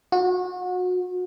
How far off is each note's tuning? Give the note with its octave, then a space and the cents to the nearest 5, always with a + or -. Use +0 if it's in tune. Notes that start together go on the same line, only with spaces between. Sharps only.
F#4 -30